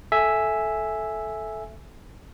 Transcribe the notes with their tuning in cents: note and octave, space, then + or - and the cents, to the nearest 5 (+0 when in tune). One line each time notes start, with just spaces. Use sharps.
A4 -10 E5 +0 G#5 +0